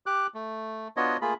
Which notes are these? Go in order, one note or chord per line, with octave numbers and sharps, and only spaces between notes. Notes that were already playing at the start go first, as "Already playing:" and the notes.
G4 D6 F#6
A3
B3 D4 F4 F#4 C#5 D#5
A3 A#3 F4 G#4 B5